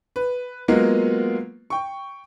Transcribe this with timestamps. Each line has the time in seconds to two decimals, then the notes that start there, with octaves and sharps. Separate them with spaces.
0.16 B4
0.68 F#3 G#3 A#3 B3 F4
1.70 G5 C#6